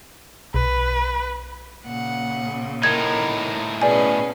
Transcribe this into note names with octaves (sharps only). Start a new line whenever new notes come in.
B1 B4
A#2 C#3 F#5
A2 D#4 A#4 G#6
B2 C#4 G#4 B4 D5 G#5